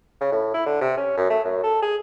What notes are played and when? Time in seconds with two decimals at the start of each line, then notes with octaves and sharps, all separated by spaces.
0.21 C#3
0.32 A2
0.54 E4
0.66 D3
0.81 C3
0.98 C#4
1.18 F#2
1.30 A3
1.45 F#2
1.63 A4
1.82 G#4